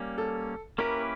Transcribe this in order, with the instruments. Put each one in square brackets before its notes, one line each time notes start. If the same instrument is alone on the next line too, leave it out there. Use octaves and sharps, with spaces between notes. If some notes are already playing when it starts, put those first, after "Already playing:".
Already playing: [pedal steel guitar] G3 A#3 C#4
[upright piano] A4
[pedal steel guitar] A#3 C#4 E4 G4 B4 [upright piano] A#4